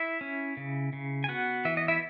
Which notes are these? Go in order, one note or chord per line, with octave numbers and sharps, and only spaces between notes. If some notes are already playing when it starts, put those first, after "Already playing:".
Already playing: E4 E5
C#4
C#3
C#3
G#5
B3 F#4 F#5
E3 E5
D#5
E4 E5